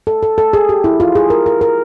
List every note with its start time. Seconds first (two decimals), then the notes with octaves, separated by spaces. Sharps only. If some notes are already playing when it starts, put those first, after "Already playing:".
0.07 A4
0.23 A4
0.38 A4
0.53 G#4
0.69 G4
0.84 E4
1.00 F4
1.15 G#4
1.30 A#4
1.46 A#4
1.61 A#4